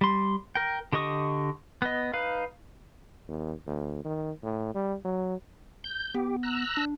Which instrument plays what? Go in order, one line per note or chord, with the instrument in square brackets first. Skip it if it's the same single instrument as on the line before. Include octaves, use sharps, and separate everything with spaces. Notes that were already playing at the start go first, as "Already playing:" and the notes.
[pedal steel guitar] G3 C6
A#4 G5
D3 G4 D#5 C#6 D#6
B3 D#5
D#4 B4 F5
[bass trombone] D#2
D2
D#3
A2
G3
F#3
[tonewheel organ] G6
[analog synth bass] B3 [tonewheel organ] G4
[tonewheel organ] A#5 E6 F#6
[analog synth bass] D4